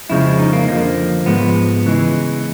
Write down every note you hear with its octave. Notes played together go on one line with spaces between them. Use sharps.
F2 C#3 F3 G#3 E4
D#4
A#3
F2 D3 F3 A#3
G#2 F3 G#3 B3
C#3 E3 G#3